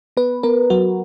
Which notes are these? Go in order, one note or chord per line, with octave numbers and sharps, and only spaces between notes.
B3 B4
B3 A#4
F#3 F#4